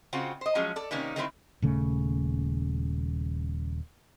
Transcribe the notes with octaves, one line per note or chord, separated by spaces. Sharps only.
C#3 C4 F4 F#4
C5 D#5
F3 F#3 G#3 C#4
A4 D5
C3 D#3 A#3 C#4 D#4
D#3 F#3 A3 C4 E4 C5
D#1 C#3 A3